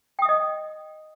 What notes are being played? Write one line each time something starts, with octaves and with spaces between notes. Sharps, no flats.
D#5 E5 G5 D#6